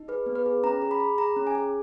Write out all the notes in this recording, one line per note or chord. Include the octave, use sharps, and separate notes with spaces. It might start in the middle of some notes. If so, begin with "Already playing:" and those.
Already playing: D#4
G#4 B4
B3
B4
G#4
C#4 A#5
G#4
B5
G#4
G#4 A#5
C#4
G#5
G#4